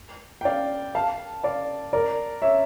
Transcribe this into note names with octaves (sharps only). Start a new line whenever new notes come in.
G5
D5 F5
F5 A5
D5 F5
A#4 D5
C#5 E5